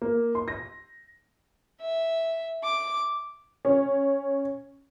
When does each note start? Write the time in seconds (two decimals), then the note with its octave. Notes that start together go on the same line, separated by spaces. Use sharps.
0.02 A#3
0.35 C6
0.48 A#6
1.81 E5
2.64 D6
3.65 C#4